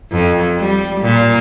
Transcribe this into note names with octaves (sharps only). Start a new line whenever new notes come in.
F2
G3
A#2